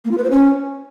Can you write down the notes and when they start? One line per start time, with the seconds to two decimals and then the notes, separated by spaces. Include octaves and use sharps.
0.05 A#3
0.11 F4
0.18 B4
0.24 C5
0.30 C#4